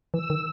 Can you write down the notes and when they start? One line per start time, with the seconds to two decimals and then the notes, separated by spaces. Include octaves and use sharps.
0.13 E3 E6
0.30 D#3